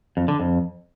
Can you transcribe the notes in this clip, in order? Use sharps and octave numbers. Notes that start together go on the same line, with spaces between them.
F2
D3
F2